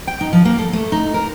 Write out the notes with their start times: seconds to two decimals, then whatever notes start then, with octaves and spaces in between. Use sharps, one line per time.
0.07 G5
0.21 D#4
0.33 F3
0.45 A#3
0.58 A4
0.73 A3
0.92 D#4
1.14 A#4